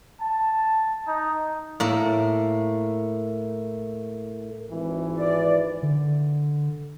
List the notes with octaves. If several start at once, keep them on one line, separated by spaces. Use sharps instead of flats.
A5
D#4
A2 A#3
G#1 E3
D5
D3